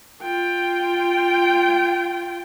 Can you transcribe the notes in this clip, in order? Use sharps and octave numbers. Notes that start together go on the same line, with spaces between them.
F4 G5